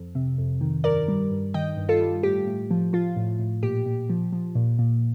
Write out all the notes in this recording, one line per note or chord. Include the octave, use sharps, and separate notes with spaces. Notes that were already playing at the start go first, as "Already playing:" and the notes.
Already playing: F2
C3
F2
D#3
G2 A#4 D5
G3
G2
D#3 D#5 G5
G2
F4 A4
G3
A2 G4
A2
F3
F3 F4
A2
A2
A#2 G4
A#2
F3
F3
A#2
A#2